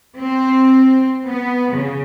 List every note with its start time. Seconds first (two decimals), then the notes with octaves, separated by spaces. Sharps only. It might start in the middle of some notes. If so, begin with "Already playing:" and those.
0.17 C4
1.28 B3
1.73 C#3